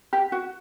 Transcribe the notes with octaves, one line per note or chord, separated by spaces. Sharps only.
G4
F#4